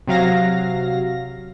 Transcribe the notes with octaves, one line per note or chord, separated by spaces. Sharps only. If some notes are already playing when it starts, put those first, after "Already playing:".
C3 F#3 F5 A#6